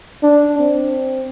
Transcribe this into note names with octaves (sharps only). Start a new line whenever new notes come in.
D4
C4